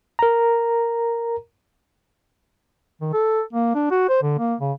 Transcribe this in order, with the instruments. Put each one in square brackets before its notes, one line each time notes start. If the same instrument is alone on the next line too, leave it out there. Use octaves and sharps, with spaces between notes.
[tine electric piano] A#4 A#5
[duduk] D#3
A4
A#3
D4
F#4
C5
D3
A#3
C#3